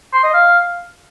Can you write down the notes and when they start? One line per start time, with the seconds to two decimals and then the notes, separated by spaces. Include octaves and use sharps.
0.13 C6
0.23 D#5
0.33 F5